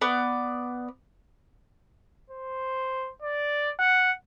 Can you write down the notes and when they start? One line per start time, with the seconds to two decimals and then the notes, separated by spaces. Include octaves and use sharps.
0.01 B3 D5
2.30 C5
3.22 D5
3.79 F#5